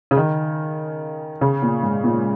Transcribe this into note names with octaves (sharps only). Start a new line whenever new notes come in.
C#3
D#3
C#3
A#2
G#2
A#2